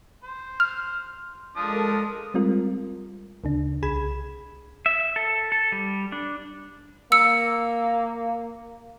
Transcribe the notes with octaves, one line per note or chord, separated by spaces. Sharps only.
C5
F6
F3 G#3 D4 A4 A#4 D#6
G3 G#3 C4 F4 A#4
D2 C#3 D4
C2 G#4 B5 G#6 E7
E5
A4
A4
G3
D4
A#3 E6 C#7